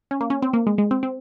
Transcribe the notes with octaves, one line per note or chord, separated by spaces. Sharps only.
C#4
A#3
C#4
C4
A#3
G#3
G#3
C4
C4